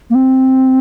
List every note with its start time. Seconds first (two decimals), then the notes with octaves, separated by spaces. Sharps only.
0.10 A#3
0.15 C4